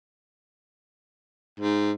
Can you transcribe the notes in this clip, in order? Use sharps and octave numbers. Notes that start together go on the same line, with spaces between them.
G#2